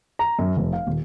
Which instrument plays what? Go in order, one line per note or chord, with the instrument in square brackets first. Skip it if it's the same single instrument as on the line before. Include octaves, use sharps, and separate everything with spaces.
[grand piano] A#5
F#2
F1
F5
D#1